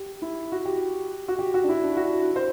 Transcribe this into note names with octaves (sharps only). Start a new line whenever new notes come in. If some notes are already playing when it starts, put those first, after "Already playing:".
Already playing: G4
E4
F#4
G4
F#4
G4
F#4
D4
E4
D4
F#4
C5